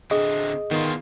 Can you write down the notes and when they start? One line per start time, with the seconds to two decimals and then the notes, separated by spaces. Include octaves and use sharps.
0.11 D3 C4 G#4 D#5
0.71 D#3 B3 F4